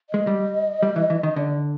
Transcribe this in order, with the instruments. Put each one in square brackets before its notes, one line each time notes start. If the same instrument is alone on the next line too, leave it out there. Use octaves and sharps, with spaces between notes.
[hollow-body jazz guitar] G#3 [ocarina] D#5
[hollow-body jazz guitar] G3
G3
E3
E3
D#3
[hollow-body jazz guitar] D3 [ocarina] D5